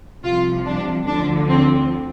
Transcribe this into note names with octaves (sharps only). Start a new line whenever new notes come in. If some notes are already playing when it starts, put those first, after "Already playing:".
C2 C3 F3 F4
D4
D2 D3 F3 D4
C4